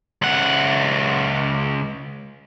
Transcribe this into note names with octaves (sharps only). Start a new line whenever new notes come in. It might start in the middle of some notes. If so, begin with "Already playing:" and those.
C#2 F#5